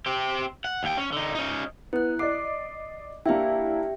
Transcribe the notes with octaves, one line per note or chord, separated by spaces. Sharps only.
C4 G4
F#5
D#2 G5
C#4
D3 D#4
C#4 D#4
B3 E4 F#6
D5 D#5 D6 C7
A#3 D4 E4 G4 E5 G5